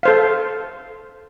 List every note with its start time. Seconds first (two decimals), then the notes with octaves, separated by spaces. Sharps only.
0.03 A4 C5 F5